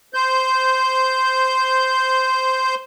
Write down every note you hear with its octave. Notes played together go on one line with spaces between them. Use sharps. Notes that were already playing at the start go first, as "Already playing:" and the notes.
C5 G6